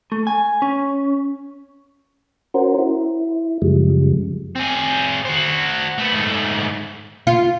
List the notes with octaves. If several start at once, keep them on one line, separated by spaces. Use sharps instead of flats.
A3
G#5
C#4
C#4 F#4 A#4 C5
E4
F#2 C#3 F3 G3 G#3
C4 G#4
F#4 C5
A3 B3
G#2 A3
F4